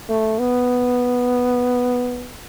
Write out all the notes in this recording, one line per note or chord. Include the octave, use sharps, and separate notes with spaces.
A3
B3